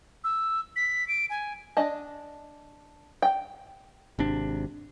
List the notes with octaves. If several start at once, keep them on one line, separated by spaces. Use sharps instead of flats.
E6
B6
D7
G#5
D4 D#5 A5
G5
G#1 C3 D4